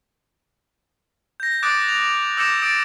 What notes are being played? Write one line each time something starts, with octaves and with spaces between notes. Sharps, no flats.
G6 A#6
D6 D#6 F#6 A6 D7
F7
D6 E6 G6 A#6 C#7 E7
D#6 A6 D7